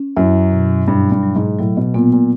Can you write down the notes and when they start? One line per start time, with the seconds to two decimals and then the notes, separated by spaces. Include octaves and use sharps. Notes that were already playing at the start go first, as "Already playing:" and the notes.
Already playing: C#4
0.16 F#2 E4
0.52 B2
0.88 G2 F#3
1.12 G2
1.23 F#3
1.36 G#2
1.59 A2 F#3
1.77 B2
1.94 A#2 B3
2.13 A#2